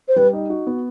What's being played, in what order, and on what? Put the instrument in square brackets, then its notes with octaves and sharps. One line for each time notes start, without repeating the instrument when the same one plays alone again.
[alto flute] C5
[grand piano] G3 [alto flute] B4
[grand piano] D#4
F#4
B3